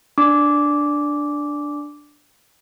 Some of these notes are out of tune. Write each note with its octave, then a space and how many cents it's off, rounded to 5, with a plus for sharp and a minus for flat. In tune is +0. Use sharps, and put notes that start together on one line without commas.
D4 +0 D6 -10